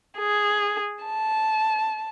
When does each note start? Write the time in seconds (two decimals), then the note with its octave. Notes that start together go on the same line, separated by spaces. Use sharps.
0.19 G#4
1.04 A5